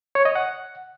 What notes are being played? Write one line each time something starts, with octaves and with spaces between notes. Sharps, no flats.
C#5
D#5
F#5